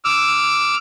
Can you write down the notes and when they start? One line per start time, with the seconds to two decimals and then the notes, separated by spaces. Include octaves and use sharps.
0.05 D6 E6 F6